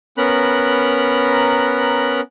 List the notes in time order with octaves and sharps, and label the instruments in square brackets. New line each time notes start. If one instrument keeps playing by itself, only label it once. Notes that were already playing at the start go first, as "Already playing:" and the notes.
[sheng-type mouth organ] B3 C#4 A#4 A#5 B5 F#6